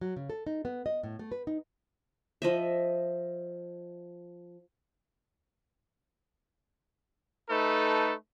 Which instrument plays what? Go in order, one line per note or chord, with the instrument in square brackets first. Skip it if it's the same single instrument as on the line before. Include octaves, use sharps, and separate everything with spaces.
[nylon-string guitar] F#3
C#3
A4
D#4
B3
D#5
A2
A3
B4
D#4
[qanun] F3 D#5 E5
[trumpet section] A3 D#4 A4 B4